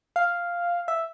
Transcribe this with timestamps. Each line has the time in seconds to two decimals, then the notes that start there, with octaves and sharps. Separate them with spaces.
0.16 F5
0.88 E5